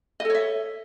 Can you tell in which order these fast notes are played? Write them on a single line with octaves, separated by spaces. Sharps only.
D#5 A4 C#5 E5